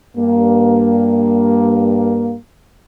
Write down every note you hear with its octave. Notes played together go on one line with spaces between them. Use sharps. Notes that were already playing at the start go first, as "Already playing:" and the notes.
G2 A#3